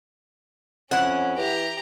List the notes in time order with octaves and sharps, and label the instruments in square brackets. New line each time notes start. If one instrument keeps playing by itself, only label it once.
[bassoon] F2 [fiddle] C#4 [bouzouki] E4 F#5
[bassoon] E3 [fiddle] G4 A#5